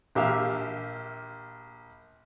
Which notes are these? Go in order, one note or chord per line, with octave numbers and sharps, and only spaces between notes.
A#1 G4 E5 F5 E6 F6